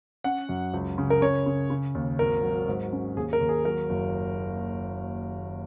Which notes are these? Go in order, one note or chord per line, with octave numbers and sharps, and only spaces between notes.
C#4 F#5
F#2
C#2
C#3
A#4
C#3 C#5
C#3
C#3
D#2
G#1 A#4
F#3
G#2
C#4
D#2 G#4
A#4
D#2
G#4
F#3 A#4
F#1